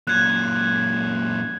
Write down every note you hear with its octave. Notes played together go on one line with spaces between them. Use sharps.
F#2 A#2 F#6 G#6